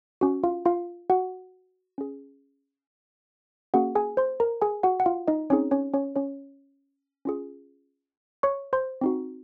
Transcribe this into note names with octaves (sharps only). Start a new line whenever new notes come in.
C#4 F#4
F4 F5
F4 F5
F#4 F#5
C#4 G#4
A#3 C#4 F#4 G#4 F#5
G#4 G#5
C5 C6
A#4 A#5
G#4 G#5
F#4 F#5
F#5
F4 F5
D#4 D#5
C4 C#4 D#4 G#4 C#5
C#4 C#5
C#4 C#5
C#4 C#5
C#4 F4 G#4
C#5 C#6
C5 C6
C4 D#4 F#4